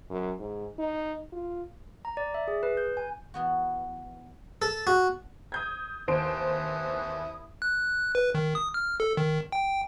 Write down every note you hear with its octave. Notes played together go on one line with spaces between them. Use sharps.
F#2
G#2
D#4
F4
A#5
D5
E5
G#4
B4
G6
G#5
E3 B3 F#4
A4
F#4
D#6 G6 G#6
D#2 E3 E4 C5 D#6 D7
F#6
B4
D#3
D#6
F6
A4
D#3
G5